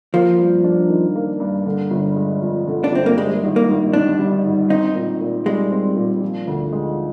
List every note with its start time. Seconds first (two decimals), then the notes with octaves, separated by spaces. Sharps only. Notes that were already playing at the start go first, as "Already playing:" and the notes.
0.14 F3 A#3
0.39 G2
0.64 D4
0.90 D#3
1.15 A#3
1.40 G2
1.66 D3
1.91 G1
2.16 G#3
2.42 F2
2.67 D3
2.84 D4
2.92 G1 C4
3.06 A#3
3.17 G3 G#3
3.43 G#1
3.56 A#3
3.68 G#1
3.93 G#2 D4
4.19 G3
4.44 G#1
4.70 C4 D#4
4.95 A#2
5.21 A#2
5.46 G3 G#3
5.71 C4
5.96 A#2
6.22 F3
6.47 D2
6.73 G#3